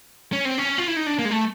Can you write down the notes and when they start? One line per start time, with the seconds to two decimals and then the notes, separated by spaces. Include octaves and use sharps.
0.33 C#4
0.45 C4
0.58 C#4
0.78 F4
0.88 E4
0.97 D#4
1.07 D4
1.19 A#3
1.25 G#3
1.31 A3